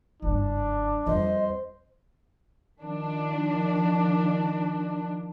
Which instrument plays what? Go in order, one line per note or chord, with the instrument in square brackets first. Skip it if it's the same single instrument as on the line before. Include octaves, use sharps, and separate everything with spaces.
[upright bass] F#1 G2 [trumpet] D4
[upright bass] F2 G3 [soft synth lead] C5 [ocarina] D#5
[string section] D#3 F3 D4